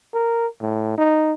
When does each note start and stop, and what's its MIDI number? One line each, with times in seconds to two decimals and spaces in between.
0.14 0.47 70
0.61 0.94 45
0.98 1.34 63